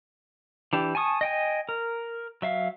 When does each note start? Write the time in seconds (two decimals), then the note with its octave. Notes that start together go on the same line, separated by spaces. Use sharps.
0.73 E3 D4 G4
0.95 G#5 A5 C#6 D#6
1.21 D#5 G5 G#5
1.69 A#4
2.42 F#3 E5 F5